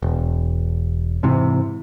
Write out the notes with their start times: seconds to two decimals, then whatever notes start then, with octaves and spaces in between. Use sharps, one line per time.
0.02 E1
1.23 G#2 C3 E3